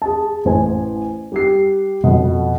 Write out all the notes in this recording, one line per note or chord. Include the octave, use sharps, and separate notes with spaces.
G#4 A5
A1 C5 G#5
G3 G4 C7
F2 B2